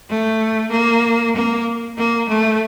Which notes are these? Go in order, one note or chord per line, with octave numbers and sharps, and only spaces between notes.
A3
A#3
A#3
A#3
A3